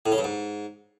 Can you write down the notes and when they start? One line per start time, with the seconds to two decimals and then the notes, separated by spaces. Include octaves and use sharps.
0.06 A2
0.12 C#3
0.18 G2
0.24 G#2